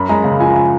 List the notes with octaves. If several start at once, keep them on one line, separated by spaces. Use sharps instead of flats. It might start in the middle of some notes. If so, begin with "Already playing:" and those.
Already playing: F#2 B5
G#3 A#5
C#3 A#5
F3 G#5
G#5